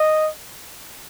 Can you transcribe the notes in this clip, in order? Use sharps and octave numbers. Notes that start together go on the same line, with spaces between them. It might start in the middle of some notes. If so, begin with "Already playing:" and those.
Already playing: D#5